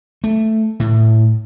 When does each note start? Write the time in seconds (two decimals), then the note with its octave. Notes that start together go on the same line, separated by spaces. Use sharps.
0.24 A3
0.80 A2